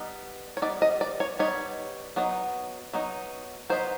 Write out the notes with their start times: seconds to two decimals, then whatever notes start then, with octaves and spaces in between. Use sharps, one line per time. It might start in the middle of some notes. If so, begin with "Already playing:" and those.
Already playing: G3 B3 D#4
0.57 C#5
0.62 G3 B3 D#4 D5
0.82 D#5
1.01 D5
1.20 C#5
1.39 G3 B3 D#4 C#5
2.16 F#3 B3 D#4
2.93 F#3 B3 D#4
3.70 F#3 B3 D#4 C5